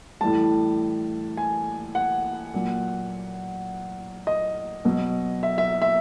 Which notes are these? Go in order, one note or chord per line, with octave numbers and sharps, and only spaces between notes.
A2 E3 G3 A5
G#5
F#5
A#2 F#3
D#5
B2 F#3
E5
E5
E5